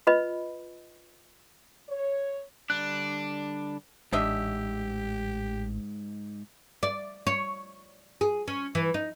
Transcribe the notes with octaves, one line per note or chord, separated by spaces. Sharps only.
F4 B4 D#5 B5
C#5
D3 G3 D4 F#6
A1 G#2 D4 G4 D#5 E5
D5
C#5
G#4
C#4
E3
D#4